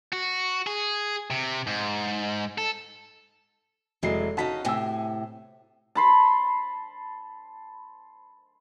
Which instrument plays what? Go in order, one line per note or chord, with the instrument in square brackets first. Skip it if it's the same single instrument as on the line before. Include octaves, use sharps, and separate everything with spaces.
[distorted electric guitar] F#4
G#4
C3
G#2
A4
[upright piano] F1 G#3 C7 [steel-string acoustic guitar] E3 F#3
[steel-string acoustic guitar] C#3 C#4 D#4 [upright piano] F#4 A5 B6
[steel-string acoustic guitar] A2 C3 [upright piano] G#5 E6
[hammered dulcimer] A5 B5 C6